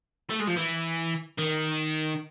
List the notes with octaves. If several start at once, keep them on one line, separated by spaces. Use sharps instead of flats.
A3
G#3
F3
E3
D#3